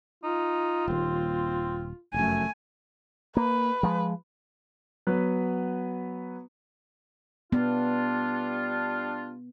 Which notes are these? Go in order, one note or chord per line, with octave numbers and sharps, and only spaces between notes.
D#4 F4
D#1 D#2 C4
F1 F#2 A3 G#5
A#3 B4
F3 G#3
F#3 B3 B4
G3 B3 D4 F4